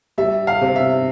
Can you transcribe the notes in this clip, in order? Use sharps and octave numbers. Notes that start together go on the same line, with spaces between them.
G3 E5
F5
C3
E5